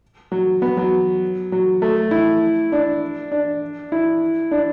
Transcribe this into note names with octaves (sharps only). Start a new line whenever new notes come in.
F#3
B3
F#3
F#3
A3
E4
D4
D4
E4
D4